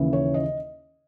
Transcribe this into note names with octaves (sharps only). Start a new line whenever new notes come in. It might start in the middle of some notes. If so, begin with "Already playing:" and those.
Already playing: D#2 C#3 E3
C#5
D#5